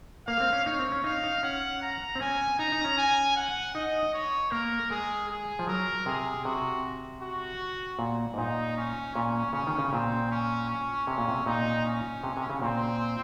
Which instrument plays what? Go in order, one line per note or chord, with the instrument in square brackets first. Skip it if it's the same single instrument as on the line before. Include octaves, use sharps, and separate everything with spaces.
[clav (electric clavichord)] A#3 [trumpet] F5
[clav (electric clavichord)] C4
C#4
[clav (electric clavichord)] D#4 [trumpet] C#5
[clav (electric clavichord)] C4
C#4
[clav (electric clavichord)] D#4 [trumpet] F5
[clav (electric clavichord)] D#4
[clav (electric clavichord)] C#4 [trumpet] F#5
[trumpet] A#5
[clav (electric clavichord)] C4
[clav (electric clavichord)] C#4 [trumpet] G#5
[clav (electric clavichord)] D#4 [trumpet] A#5
[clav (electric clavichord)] D#4
C#4
[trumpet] G#5
F#5
[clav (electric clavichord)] D#4 [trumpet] D#5
[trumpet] C#5
[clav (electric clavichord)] A#3 [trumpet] A#4
[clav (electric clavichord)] G#3 [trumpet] G#4
[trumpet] G#4
[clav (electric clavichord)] F3
[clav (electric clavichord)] F#3 [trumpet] A#4
[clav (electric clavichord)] C3 [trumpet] G#4
[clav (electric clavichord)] C3 [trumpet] F#4
[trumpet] F#4
[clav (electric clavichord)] A#2
G#2
[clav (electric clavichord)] A#2 [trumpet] D#4
[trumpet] C#4
[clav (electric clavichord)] A#2 [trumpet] C#4
[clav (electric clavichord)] C#3 [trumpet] C#4
[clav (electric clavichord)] D#3
C#3
[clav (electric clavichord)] A#2 [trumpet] C4
[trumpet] C#4
C#4
[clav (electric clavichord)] C3 [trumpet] C#4
[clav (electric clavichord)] A#2
C3
[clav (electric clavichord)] A#2 [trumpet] D#4
[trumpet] C#4
[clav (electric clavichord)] C3
C3
C#3
[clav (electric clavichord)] A#2 [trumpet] C4